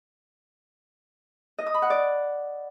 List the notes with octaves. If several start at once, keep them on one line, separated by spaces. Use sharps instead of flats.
D#5
D#6
B5
F#5
D5